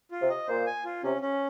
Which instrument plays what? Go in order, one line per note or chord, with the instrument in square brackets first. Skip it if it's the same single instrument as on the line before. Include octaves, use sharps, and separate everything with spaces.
[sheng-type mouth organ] F4
[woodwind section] C3
[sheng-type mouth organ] D#5
[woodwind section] A#2 [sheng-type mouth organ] C5
[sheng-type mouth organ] G#5
F4
[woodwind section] C3 [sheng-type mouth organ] C#4
[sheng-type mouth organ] C#4